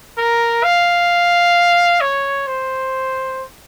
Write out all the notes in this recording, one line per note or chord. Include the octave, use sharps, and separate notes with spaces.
A#4
F5
C#5
C5